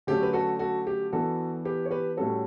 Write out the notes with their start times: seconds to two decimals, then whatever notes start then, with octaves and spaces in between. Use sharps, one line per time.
0.07 D3 F#3 A3 C#4 G4
0.23 B4
0.33 F#4 A4
0.59 F#4 A4
0.87 G4
1.12 E3 B3 D4 F#4 A4
1.65 G4 B4
1.85 C#5
1.90 G4 B4
2.17 A2 G3 C#4 F#4 A4